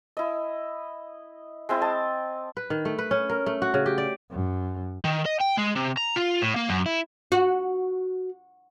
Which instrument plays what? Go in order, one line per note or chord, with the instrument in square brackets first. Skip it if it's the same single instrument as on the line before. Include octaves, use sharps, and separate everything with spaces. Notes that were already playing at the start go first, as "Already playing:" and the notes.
[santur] E4 D#5
G#3 C4 E4
D#5 A5
[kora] B4
D#3
A3
B4
C#4
A#4
A3
F#4
C#3
G4
D5
[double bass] F#2
[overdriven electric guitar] D#3
D#5
G5
G#3
C3
A#5
F4
A2
A#3
F#2
E4
[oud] F#4